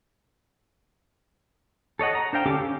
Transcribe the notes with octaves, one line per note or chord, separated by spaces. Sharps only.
A4 C#5 D#5 F#5
A#5
D4 C5 F5 G5
D3 C#4 G4 A4 D6
C#4